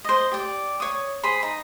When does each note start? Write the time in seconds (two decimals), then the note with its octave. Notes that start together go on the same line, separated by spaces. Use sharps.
0.05 C5 D#5
0.32 G4 D5
0.80 C#5 D#6
1.23 G#4 C5 B5 C6
1.43 D#4